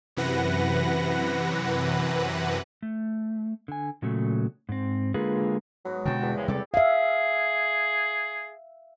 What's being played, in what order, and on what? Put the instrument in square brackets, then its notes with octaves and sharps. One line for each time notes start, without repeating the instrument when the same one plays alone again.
[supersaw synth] F#2 C3 E3 B4 F#5 A#6
[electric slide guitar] A3
D3 G#5
A#2 C#3 F#3 A3
G#2 C4
D3 G#3 A#3 F4 G#4 B4
[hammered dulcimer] G#2 B3 F#4 [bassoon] F#3
[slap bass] B2 D3 [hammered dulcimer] G#3 [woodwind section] F#4 G5 A5
[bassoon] E2 [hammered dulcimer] G3
[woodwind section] C#3 F3 G#3 [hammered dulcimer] C#5 G5
[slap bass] C3 G3 G#3 [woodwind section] G4 A4 D5
[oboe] G#4 [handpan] E5 F5